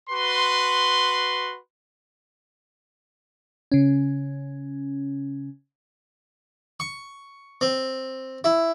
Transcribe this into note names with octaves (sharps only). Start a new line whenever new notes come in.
F#4 B4 C6
C#3 C#4
C#6
C4
E4